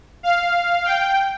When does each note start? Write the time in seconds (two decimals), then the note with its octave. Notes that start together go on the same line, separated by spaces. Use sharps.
0.23 F5
0.85 G5